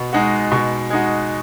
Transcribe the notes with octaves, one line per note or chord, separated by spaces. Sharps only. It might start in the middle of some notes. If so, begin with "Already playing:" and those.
Already playing: B2
G#3 D#4 F#4
B2
G#3 D#4 F#4